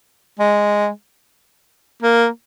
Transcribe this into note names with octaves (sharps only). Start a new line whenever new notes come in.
G#3
A#3